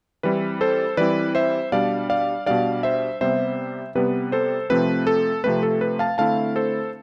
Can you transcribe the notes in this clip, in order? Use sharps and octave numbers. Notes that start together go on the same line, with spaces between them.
E3 G3 C4 E4 B4
A4 C5
E3 G3 C4 E4 B4 D5
C5 E5
B2 G3 D4 D5 F5
D5 F5
B2 G3 D4 D5 F5
C5 E5
C3 G3 B3 C5 E5
C3 G3 B3 B4
A4 C5
C3 F3 A3 C4 B4
A4
C3 F3 A3 C4 B4
A4
B4
F5 A5
D3 A3 C4 E4 F5 A5
A4 C5